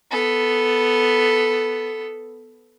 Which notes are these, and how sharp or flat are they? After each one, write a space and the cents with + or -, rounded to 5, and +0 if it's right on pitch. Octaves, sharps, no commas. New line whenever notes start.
B3 +0 A4 +0